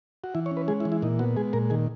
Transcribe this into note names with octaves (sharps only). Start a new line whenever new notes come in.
F#4
E3 E4
C#5
C#4
B4
G#3 G#4
E4
E3
E4
A#2 D#4
B3 F#4
G#3 G#4
A#2 A#4
D#3 G#4